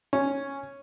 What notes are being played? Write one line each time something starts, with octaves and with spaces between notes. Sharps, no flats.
C#4